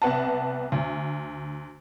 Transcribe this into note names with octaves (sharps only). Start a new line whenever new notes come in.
C2 B3 F#5 A5
D2